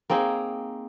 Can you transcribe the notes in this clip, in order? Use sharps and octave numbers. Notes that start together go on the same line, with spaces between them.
A#3 C4 D#4 G#4